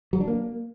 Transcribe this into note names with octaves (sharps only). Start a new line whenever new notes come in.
F#3
D4
A#3